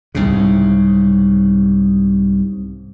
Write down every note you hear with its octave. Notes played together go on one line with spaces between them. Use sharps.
C2 G#2 C#3